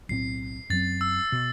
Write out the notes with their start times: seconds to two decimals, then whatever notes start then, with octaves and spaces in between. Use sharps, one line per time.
0.09 B1 A2 G3 C4 C7
0.70 F#2 F#3 C4 A6
1.01 E6
1.32 B2